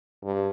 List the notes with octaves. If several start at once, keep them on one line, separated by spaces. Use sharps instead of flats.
G2